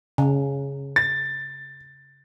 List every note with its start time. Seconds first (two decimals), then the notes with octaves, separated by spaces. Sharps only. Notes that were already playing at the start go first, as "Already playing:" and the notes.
0.18 C#3
0.96 A6